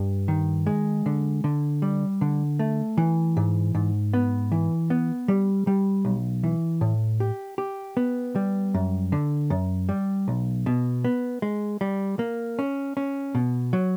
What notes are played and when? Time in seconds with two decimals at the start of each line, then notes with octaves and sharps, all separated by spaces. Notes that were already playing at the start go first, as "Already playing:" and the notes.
Already playing: G2
0.28 D#3
0.67 G#3
1.06 D3
1.44 D3
1.82 G3
2.21 D3
2.59 A3
2.98 E3
3.37 G#2
3.75 G#2
4.13 B3
4.52 E3
4.90 B3
5.28 G3
5.67 G3
6.05 B1
6.44 E3
6.81 A2
7.20 G4
7.58 G4
7.97 B3
8.36 G3
8.74 F#2
9.12 D3
9.50 F#2
9.89 G3
10.28 B1
10.66 B2
11.04 B3
11.42 G#3
11.81 G3
12.19 A#3
12.59 C#4
12.97 C#4
13.35 B2
13.73 F#3